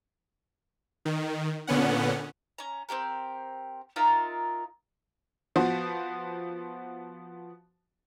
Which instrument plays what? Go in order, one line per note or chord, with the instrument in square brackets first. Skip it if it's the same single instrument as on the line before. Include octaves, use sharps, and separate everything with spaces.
[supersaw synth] D#3
A#2 D3 B3 C#4 F#5
[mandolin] C#4 A#5
C4 C#4 G4 A#4
D#4 F4 A#4 E5
[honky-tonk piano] F3 B3 F#4 C5